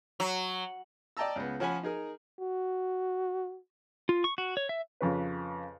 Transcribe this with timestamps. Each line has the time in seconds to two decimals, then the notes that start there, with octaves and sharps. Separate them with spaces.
0.20 F#3
1.17 D5 D#5 G5 A5 A#5 E6
1.36 C#2 B3
1.60 F3 C#4 F#5 G#5 B5
1.83 D#4 G#4 A#4
2.41 F#4
4.09 F4
4.24 C#6
4.38 F#4
4.57 C#5
4.69 E5
5.01 F2 C#3 B4